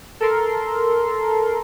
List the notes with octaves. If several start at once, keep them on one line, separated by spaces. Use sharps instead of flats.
A4 A#4 C6